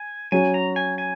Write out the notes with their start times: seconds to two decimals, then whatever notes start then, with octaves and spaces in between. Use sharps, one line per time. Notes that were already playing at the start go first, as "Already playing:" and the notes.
Already playing: G#5
0.32 F#3 C#4 F#4 G#5
0.54 A#5
0.76 G#5
0.98 G#5